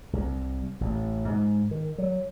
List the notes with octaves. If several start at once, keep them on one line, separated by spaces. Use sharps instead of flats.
C2
A1
G#2
D#3
F#3